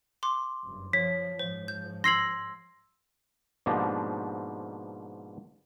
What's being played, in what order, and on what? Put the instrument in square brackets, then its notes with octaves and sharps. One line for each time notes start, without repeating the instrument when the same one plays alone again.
[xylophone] C6 D6
[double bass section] F#1 G2
[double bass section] F3 [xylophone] C#5 [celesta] B6
[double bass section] G#2 F3 [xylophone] C5
[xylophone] G6
[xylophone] C6 E6 G#6 [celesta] A#6 C7 F#7
[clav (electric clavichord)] G#2 B2 F3 A#3 D4 G4